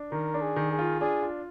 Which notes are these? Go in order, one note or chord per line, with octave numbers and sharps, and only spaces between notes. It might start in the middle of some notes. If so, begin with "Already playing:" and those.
Already playing: D4
D#3 A#4
D4
G#4
D#3
G#4
F4
D4 G#4
F4